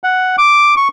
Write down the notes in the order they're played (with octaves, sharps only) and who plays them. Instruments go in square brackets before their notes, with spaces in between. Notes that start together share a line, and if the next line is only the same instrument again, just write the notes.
[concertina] F#5
D6
C#6